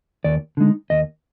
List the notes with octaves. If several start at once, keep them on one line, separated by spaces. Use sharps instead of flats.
D#2 D5
D3 G#3 D#4
D#2 D#5